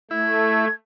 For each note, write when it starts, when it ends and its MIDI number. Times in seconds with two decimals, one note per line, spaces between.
0.11 0.68 57
0.11 0.65 64
0.11 0.72 92